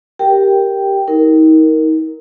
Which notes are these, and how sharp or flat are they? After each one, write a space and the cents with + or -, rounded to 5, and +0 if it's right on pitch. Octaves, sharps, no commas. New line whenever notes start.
G4 +0 A#4 +0 G5 +0
D#4 +35 A#4 +0